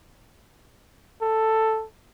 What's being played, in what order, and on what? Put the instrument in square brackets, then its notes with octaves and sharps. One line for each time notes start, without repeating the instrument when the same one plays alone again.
[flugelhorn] A4